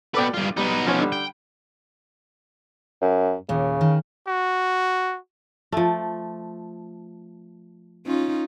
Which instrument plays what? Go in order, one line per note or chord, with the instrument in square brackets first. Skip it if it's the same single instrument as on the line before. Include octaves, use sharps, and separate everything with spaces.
[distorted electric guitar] B2 B4 [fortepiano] A4 D5 G5
[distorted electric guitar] G2 F4
[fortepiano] G3 [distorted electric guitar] B3 D#4
[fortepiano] F3 C#4
D3 G3
[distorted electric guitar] G5
[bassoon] F#2
[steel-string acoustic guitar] D#2 A#2 [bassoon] C#3
[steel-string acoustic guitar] D#3
[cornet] F#4
[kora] F3 A3
[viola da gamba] C#4 D#4 F4